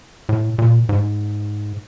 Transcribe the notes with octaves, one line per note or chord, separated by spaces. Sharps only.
A2
A#2
G#2